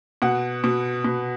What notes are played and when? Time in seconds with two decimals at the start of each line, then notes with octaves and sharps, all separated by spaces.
0.22 B2 F#5
0.64 B2
1.04 B2